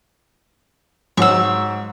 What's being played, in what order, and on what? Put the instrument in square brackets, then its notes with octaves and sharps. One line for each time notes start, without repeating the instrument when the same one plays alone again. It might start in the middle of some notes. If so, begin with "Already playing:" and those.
[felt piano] G#2 F#3 [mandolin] C#6 E6